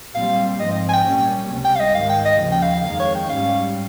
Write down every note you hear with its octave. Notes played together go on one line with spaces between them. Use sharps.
A#2 G3 C4 F5
G#2 F3 C4 D#5
D#5
G#5
G5
A#2 G3 C#4
C#2 C3 G3 C#4
G5
F5
D#5
G#2 D#3 G#3 F5
G5
D#5
D#2 C#3 F3
G5
F5
F2 D#3 G#3 F5
C#5
G5
G#2 G3 C#4 F5